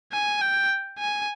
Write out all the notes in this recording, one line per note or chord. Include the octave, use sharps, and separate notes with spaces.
G#5
G5
G#5